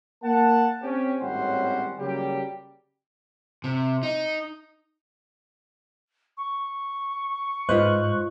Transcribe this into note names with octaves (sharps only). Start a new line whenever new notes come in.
A#3 F#5 A5
C4 C#4 G4
G#1 A2 G3 C#4 C5 F#5
C#3 F#3 G3 A#3 G4
C3
D#4
C#6
G#2 F4 B4 C5 D#5 F#6